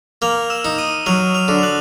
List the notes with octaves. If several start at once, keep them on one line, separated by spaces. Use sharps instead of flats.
A#3 F6 F7
E6 E7
D#4
D#6 D#7
F#3 F6 F7
F6 F7
D3
F7
F#6 F#7